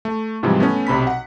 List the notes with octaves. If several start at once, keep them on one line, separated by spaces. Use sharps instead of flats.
A3
G#2 C3 E3 F3 G3 G#3
A3 B3 C#4
B1 C3 B5 B6
F#5